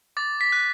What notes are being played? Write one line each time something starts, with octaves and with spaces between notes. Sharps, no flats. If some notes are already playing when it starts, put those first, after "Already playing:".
D6 A6
B6
F#6